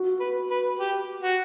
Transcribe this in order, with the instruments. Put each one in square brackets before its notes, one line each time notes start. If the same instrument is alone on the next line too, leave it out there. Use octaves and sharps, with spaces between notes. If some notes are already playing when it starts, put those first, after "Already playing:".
Already playing: [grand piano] F#4
[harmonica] B4
B4
G4
F#4